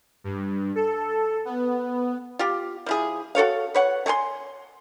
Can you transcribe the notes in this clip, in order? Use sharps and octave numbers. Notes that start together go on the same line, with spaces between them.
G2
A4
B3
F4 G4
F3 E4 G#4
F#4 A4 C#5 F5
B4 C#5 F#5
A3 C#5 G#5 C6